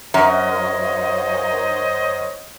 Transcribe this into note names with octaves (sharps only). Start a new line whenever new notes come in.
F#2 C5 C#5 D#5